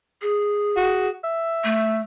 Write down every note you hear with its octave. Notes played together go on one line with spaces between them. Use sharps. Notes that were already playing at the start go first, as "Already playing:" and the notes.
G#4
F#4
E5
A3